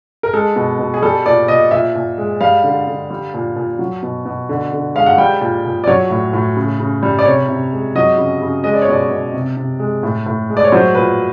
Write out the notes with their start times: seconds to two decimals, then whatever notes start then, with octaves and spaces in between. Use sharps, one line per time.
0.23 A#4
0.33 G#3 A4
0.56 B2
0.79 B2
0.94 G#4
1.02 G3 A4
1.26 A#2 D5
1.48 A#2 D#5
1.71 A#2 E5
1.95 A#2
2.18 G#3
2.41 G3 F5
2.64 D3
2.87 D3
3.11 G3
3.34 A#2
3.56 A#2
3.79 F#3
4.03 B2
4.25 B2
4.49 D3
4.72 D3
4.95 G#3 F5
5.06 F#5
5.18 G3 G5
5.41 A#2
5.65 A#2
5.84 D5
5.87 F#3 C#5
6.10 A2
6.33 A2
6.57 C#3
6.80 C#3
7.03 G3
7.19 D5
7.25 C3 C#5
7.48 C3
7.73 G#3
7.95 F#3 D#5
8.18 C#3
8.42 C#3
8.64 G#3 D#5
8.74 D5
8.82 C#5
8.88 B2 D5
9.11 B2
9.34 C3
9.57 C3
9.79 G#3
10.03 A2
10.26 A2
10.50 G#3
10.57 D5
10.64 C#5
10.72 F#3 C5
10.95 A#2 B4